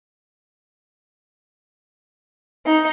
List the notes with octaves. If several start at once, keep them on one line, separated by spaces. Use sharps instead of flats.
D#4